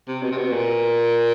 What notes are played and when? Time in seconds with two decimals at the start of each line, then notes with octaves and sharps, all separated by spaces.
0.08 C3
0.23 B2
0.32 C3
0.38 B2
0.53 A#2